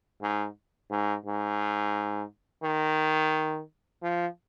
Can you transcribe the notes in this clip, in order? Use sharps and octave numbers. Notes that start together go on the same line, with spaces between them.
G#2
G#2
G#2
D#3
F3